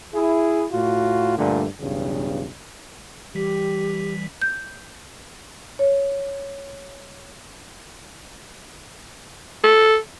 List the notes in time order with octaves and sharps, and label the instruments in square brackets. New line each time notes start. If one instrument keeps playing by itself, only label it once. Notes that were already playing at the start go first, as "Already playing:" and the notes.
[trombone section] E4 G#4
A2 F4 F#4
G2 A#2 D3 A3
B1 E2 G2 C#3
[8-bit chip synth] E3 G3 B6 [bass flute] G4
[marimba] G6
C#5
[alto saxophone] A4